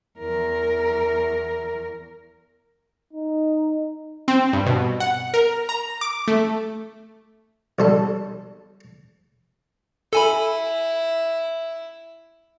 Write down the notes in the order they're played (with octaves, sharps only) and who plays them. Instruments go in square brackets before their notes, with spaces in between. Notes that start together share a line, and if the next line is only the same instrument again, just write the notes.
[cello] E2 A#4
[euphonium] D#4
[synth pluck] C4
G2
B2
F#5
A#4
A#5
D6
A3
[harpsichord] B1 G3 A4
[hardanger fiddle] E4 [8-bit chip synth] A4 G#5 B5